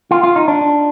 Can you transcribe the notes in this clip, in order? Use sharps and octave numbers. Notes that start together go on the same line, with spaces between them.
F4
F4
D#4
D4